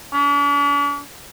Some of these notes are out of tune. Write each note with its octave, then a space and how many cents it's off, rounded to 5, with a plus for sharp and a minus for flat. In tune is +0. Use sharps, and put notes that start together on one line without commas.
D4 -45